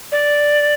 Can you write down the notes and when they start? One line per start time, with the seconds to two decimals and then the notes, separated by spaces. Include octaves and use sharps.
0.12 D5